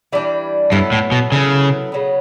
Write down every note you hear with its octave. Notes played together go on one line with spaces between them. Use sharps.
E3 G3 D4
G2 F#3 B3 E4 A4
A2
B2
C#3 F#3 B3 E4 A4
C#3 F#3 B3